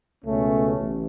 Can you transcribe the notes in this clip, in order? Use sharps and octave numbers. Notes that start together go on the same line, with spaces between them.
C#2 B2 A3 C#4
A1 A2